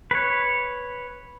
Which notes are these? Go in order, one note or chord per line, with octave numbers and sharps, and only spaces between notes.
B4 C#5